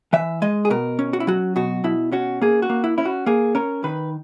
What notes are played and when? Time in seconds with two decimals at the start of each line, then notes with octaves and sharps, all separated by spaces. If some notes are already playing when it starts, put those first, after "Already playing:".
0.13 E3 E5
0.42 G#3 D#5
0.65 G#4
0.70 B2 A#4
0.99 C#4
1.13 F#4
1.20 E4
1.27 F#3 F#4
1.56 B2 F#4
1.84 B2 E4
2.12 C#4 F#4
2.41 A#3 G#4
2.62 F#4
2.70 A#3
2.84 E4
2.98 C#4 E4
3.05 F#4
3.26 A#3 G#4
3.55 C#4 A#4
3.84 D#3 B4